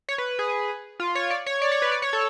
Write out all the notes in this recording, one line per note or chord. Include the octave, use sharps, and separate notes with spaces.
C#5
B4
G#4
F4
C#5
D5
C#5
D5
C#5
B4
D5
C#5
A4